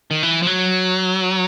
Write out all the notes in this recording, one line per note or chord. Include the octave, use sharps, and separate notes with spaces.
D#3
E3
F3
F#3